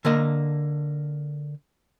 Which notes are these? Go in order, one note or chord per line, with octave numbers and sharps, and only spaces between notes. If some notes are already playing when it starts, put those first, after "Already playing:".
D3 A#3 D#5